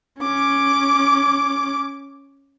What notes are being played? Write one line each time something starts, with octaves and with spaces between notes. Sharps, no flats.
C#4 D6